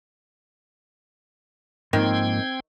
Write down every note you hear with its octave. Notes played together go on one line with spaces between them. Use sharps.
G#2 D#3 F3 A#3 C4 G5 G#6